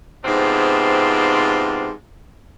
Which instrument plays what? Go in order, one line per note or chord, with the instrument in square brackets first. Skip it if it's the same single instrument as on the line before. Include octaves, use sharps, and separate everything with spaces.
[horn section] G#2 C3 B3 C4 D4 F4